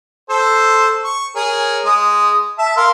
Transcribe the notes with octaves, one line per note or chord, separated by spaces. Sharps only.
A4 C5
C#6
G#4 A#4 C#5
G#3 D#6
E5 A5
A#4 F5 C6